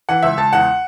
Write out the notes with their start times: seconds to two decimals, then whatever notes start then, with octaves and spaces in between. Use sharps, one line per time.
0.09 E3 F#5
0.22 C#2 E5
0.37 C#2 A5
0.53 E2 F#5